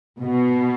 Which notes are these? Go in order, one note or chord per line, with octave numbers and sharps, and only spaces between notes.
B2